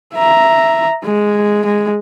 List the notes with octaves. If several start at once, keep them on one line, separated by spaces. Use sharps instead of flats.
E5 A#5
G#3
G#3